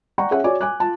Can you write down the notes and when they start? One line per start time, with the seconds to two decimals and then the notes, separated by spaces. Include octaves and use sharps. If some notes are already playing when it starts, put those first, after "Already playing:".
0.18 D5 F#5 G5 A#5 C#6
0.31 C#4 G#4 C#5 E5 F#5
0.44 F#4 C#5 D5 G#5 D6
0.61 G#5 D6 F#6
0.80 F4 A5